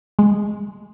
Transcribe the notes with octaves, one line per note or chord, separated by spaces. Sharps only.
G#3